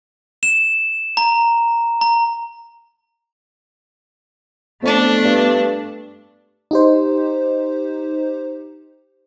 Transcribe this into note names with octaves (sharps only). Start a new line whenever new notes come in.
E7
A#5
A#5
F2 A3 B3 D4
G2
D#4 G4 C5